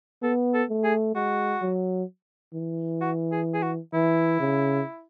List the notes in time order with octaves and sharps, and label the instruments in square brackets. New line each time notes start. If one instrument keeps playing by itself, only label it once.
[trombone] B3 [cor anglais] A4
[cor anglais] A4
[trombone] A3
[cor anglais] G#4
[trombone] G#3 [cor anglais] F#4
[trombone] F#3
E3
[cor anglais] F#4
G#4
G#4
F#4
[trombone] E3 [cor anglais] E4
[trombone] C#3